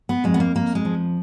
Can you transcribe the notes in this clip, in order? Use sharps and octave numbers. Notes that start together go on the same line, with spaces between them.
B3
F2 G#3
B3
A#3
F2 A#3
G#3
F3